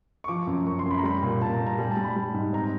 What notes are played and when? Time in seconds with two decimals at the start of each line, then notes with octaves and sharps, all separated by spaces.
0.24 C#6
0.28 F3 D6
0.47 F#2
0.66 F#2 C#6
0.79 C6
0.86 F#2
0.91 B5
0.98 A#5
1.03 G3 B5
1.23 A#2
1.41 A#2 A5
1.54 A#5
1.60 G3
1.67 A#5
1.78 G3 G#5
1.91 A5
1.97 G3
2.04 B5
2.16 G3
2.34 G#2
2.53 C4 A#5